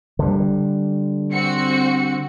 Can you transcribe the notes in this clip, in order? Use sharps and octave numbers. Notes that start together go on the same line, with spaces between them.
D3 G3
C4 F#4 C#7